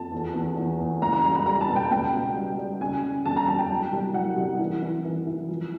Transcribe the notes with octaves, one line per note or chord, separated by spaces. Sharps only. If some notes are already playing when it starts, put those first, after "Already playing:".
Already playing: F2 A5
E2
E2
E2
E2
C#2 A#5
A#5
G3 A#5
B5
G3 A#5
A5
B2
G5
C#2 G5
B2
G3
G3
C#3 G#5
C#3
G1 A5
A#5
G1 A5
G5
F#3
C2
F#3 F#5
C2
E3
E3
E3
E3
F3